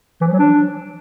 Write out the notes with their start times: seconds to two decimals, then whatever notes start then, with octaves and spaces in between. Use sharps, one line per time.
0.21 E3
0.27 F3
0.33 F#3
0.39 D4